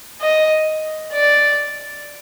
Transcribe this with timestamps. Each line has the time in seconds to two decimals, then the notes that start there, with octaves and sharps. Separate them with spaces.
0.21 D#5
1.13 D5